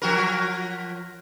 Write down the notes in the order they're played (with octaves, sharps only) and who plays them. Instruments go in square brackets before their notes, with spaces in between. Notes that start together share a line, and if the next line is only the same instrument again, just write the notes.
[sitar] F3 F#4 A#4